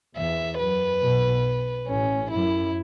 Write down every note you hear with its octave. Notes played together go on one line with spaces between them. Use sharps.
E2 E5
F#2 B4
B1 B2
A1 A2 C#4
F#2 E4